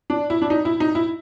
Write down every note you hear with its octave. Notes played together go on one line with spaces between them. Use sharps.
D4
E4
D4
D#4
E4
D#4
E4